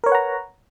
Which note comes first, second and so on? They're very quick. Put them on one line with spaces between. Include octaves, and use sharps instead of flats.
A#4 C#5 B4 F#5 A#5